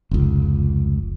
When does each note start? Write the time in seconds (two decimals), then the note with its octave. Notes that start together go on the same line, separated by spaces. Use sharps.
0.11 F1 C#2